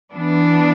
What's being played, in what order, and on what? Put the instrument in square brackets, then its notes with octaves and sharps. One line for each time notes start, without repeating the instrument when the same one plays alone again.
[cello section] E3 B3 D4